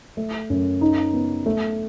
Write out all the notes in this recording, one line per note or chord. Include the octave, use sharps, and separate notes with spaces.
A3
F#2
D#4
B3
A3